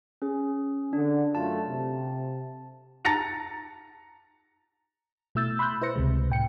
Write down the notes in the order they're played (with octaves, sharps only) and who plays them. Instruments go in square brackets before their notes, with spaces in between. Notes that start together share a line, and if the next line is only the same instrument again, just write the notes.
[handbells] C#4 G#4
[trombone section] D3 [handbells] D4
[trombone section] F#2 A3 F4 [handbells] A5
[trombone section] C3
[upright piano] A5 A#5 A6 A#6 C#7 F7
[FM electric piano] B2 A3 E4 E6 G6 A6
B5 C6 E6 F#6 G6
E4 B4 C5 A#6 C#7
C#2 C3 G#3
A2 G5 C#7